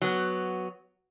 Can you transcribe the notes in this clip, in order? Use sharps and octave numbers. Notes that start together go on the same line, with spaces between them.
F#3 B3